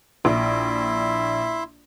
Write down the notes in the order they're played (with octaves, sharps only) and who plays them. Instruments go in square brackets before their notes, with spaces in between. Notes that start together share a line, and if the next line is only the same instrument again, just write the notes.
[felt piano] A#1 [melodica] E4 E5 C6